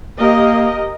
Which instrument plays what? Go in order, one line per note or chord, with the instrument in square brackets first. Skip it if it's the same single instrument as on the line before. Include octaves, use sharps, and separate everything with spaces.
[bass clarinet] A#3 [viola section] G4 A#4 D#5